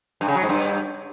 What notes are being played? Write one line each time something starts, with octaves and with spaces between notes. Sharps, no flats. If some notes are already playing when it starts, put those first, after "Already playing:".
G2
C#3
F#3
G#2
G2